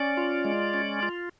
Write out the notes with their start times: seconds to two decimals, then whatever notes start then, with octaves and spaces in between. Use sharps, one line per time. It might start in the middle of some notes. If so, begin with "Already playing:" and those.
Already playing: C#4 D5
0.17 F4
0.45 G#3
0.74 C#4
1.03 F4